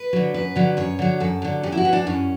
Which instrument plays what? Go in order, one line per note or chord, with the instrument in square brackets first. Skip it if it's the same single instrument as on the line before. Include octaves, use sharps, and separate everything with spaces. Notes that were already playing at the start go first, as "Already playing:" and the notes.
Already playing: [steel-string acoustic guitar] B4
D3 F#3
F#2 B4
D3 F#3
F#2 C#5
D3 F#3
F#2 A4
D3 F#3
F#2 G4
E4
F#4
E3
D4
F#2 C#4